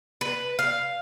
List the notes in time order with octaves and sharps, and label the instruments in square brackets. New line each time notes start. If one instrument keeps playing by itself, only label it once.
[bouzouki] B4
F5